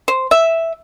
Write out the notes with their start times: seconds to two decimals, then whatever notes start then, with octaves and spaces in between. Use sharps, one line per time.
0.08 C5
0.31 E5